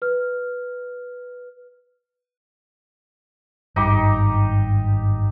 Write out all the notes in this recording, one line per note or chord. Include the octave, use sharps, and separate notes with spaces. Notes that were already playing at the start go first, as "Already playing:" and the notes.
B4 F6
G#1 G2 D#4 G4 D6